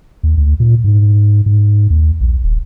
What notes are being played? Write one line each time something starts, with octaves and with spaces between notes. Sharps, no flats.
D#2
D2
A#2
G#2
G#2
D#2
A#1
D#1